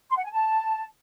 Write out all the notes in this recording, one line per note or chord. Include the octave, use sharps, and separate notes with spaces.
C6
F#5
G#5
A5